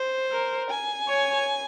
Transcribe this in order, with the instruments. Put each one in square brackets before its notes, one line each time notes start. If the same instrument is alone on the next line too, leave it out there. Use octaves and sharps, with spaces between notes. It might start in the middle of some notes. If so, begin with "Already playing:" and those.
Already playing: [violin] C5
[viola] A#4
[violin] G#5
[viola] C#5